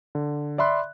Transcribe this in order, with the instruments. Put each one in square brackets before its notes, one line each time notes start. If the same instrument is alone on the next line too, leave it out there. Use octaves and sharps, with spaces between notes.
[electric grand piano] D3
D5 E5 B5 C6 F#6